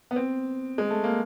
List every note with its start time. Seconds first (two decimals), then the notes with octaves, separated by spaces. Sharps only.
0.11 B3
0.16 C4
0.78 G#3
0.90 A3
1.04 A#3